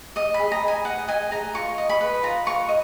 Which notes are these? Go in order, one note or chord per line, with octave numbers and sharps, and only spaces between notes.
D#5 D#6
B5
G#4
A#5
D#5 G#5
G#4 F#5
D#5 G#5
G#4 A#5
F4 C#6
D#5
B5
B4
F4 A#5
F4 C#6
D#5